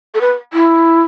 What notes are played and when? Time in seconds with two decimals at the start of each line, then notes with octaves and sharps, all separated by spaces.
0.14 A4
0.21 B4
0.53 E4